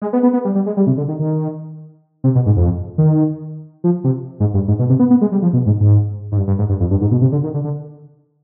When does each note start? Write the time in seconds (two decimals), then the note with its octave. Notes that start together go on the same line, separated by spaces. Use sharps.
0.02 G#3
0.13 B3
0.23 B3
0.33 B3
0.45 G3
0.55 G3
0.66 G#3
0.77 G3
0.87 C3
0.97 D3
1.08 D#3
1.19 D#3
2.24 C3
2.35 B2
2.46 G#2
2.57 F2
2.98 D#3
3.84 F3
4.04 C3
4.40 G#2
4.54 G2
4.68 G#2
4.79 B2
4.90 C3
4.99 B3
5.10 B3
5.21 G#3
5.32 G3
5.42 F3
5.53 B2
5.66 G#2
5.80 G#2
6.32 G#2
6.37 G2
6.47 G2
6.59 G#2
6.69 G2
6.80 F2
6.91 G2
7.01 G#2
7.11 B2
7.21 C3
7.32 D3
7.44 D#3
7.54 D3
7.64 D3